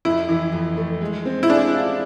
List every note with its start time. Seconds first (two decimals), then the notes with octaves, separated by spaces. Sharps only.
0.05 F2 E4
0.29 E3
0.53 F2
0.77 A3
1.01 G#3
1.26 C4
1.43 E4
1.49 D4 G#4
1.73 F4